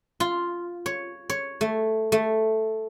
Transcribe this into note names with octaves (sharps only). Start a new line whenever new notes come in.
F4
C#5
C#5
A3
A3